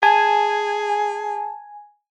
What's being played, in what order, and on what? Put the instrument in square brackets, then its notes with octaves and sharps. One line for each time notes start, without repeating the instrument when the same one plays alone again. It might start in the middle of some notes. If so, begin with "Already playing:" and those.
[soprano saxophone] G#4 [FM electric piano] G#5 [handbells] A5